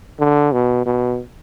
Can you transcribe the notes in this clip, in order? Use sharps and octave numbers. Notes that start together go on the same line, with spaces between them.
D3
B2
B2